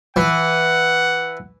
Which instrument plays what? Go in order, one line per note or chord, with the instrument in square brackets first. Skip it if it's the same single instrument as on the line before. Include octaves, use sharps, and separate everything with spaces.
[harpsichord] E3 [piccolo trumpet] F#5